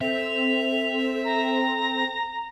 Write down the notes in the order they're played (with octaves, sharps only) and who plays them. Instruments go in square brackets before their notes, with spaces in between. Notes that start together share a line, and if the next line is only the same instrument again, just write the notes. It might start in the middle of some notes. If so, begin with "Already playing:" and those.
[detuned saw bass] C4 [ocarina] A4 [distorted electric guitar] E5 [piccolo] F7
[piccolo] A#5